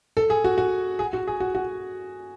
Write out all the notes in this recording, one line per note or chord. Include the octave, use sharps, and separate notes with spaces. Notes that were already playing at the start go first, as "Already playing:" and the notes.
A4
G#4
F#4
F#4
G#4
F#4
G#4
F#4
F#4